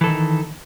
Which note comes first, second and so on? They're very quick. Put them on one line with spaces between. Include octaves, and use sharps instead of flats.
E3 A4 D#3 D#4